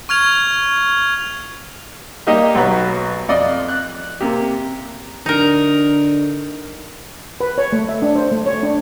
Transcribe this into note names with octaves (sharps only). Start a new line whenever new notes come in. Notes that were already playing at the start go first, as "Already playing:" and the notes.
C#6 F6 G#6 F7
G3 A#3 D#4 G4 D#5
B1 F#3 F#4 B4
F2 D5 D#5
F#6
C3 A#3 G4
D3 D#4 A#4
B4
C#5
A3
E5
D4
C5
A3
C#5
D4